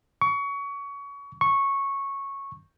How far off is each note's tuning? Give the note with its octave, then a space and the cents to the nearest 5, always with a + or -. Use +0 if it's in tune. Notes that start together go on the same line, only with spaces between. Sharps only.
C#6 +25
C#6 -10